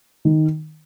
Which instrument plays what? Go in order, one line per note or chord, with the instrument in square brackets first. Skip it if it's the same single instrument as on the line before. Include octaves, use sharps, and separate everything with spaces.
[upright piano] D#3